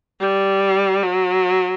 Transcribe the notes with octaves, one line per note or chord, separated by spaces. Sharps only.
G3
F#3